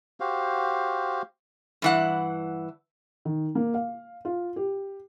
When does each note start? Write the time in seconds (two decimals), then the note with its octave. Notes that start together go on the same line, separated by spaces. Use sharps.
0.20 F#4 G4 C5 F5
1.82 G2 E3 F#5
3.25 D#3
3.55 A#3
3.74 F5
4.25 F4
4.56 G4